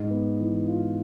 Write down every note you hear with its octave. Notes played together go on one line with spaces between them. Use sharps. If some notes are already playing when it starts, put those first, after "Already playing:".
Already playing: G#2
B3
E3
F4